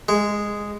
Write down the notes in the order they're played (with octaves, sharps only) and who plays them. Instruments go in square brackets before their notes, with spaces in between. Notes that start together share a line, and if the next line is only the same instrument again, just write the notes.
[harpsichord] G#3